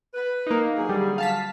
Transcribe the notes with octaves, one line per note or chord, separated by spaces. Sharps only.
B4
A#3 D#4
D3 F#3 G#4
G3
F5 A5 B6